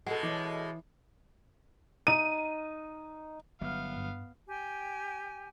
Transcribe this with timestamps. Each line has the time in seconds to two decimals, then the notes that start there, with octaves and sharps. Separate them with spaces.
0.07 B2 G#3 F#4 A4 C7
0.23 E3 C#5 E5 D6
2.07 D#4 D#7
3.61 G1 F#3 B3 E5 F5 F6
3.97 G2
4.48 G4 G5 G#5